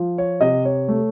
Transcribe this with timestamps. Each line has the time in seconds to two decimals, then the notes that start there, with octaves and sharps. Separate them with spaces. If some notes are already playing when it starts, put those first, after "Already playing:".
Already playing: F3
0.18 C#5
0.41 C3 D#5
0.65 C#5
0.88 A3